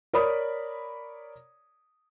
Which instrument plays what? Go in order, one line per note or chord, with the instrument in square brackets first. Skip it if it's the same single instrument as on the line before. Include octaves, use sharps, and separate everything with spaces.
[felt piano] A#4 C#5 D5 B5 D#6